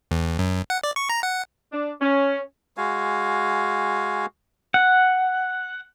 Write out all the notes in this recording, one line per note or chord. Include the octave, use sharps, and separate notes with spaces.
E2
F#2
F#5
D5
C#6
A#5
F#5
D4
C#4
G#3 F#4 F5 G#5
F#5